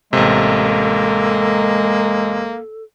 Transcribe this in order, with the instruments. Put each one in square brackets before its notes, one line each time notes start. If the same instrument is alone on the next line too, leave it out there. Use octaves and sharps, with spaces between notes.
[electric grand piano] A1 C3 [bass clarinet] G#3 [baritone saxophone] A#3 [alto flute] A4